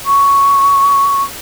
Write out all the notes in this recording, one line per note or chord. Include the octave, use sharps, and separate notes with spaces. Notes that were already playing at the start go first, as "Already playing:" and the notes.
C#6